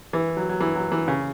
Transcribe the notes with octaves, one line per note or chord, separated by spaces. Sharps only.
E3
F#3
F#3
E3
F#3
E3
C#3